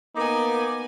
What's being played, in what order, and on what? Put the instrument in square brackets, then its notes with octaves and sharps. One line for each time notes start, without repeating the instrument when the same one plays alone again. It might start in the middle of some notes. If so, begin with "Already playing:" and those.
[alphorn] A#3 [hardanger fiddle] B3 G#5 [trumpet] D#4 [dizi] D6